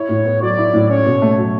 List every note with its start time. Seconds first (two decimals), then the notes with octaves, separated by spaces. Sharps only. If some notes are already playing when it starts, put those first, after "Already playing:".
Already playing: E4 C#5
0.09 A2
0.25 B3
0.42 F#3 D5
0.58 E4
0.73 A2
0.90 C#4 C#5
1.06 B2
1.22 A3
1.38 F#3